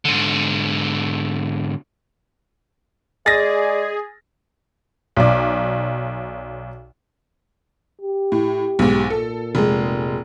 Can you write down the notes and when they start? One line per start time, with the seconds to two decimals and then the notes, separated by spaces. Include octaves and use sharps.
0.05 G#2 D3
3.26 G#3 G#4 D5 A6 A#6
5.17 B1 D5
8.01 G4
8.32 A2
8.79 B1 G#2
9.10 A#2 A4
9.55 F1 G#3